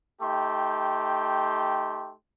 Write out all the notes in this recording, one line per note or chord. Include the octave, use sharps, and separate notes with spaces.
A3 D#4 G4 G5 C6